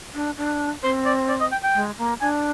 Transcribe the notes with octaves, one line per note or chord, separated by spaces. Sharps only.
D4
D4
C4 C5
D5
D5
D#5
G5
G5
G#3
A#3
D4 G#5